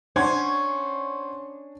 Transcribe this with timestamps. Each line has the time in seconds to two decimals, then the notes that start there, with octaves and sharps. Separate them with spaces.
0.16 C#4 D4 C5 F#5 C6 G#6